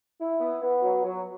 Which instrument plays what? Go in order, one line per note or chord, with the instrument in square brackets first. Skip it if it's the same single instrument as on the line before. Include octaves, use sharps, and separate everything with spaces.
[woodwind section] E4
B3
B3
F#3
F#3